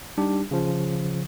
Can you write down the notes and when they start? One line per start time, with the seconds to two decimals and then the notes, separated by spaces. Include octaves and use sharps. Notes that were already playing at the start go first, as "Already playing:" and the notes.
0.18 G3 D4 D#4 G4
0.51 C#3 F3